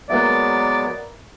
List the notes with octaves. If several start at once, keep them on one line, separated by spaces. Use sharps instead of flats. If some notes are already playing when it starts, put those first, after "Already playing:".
F#3 G#3 A#3 B3 B4 D5 E5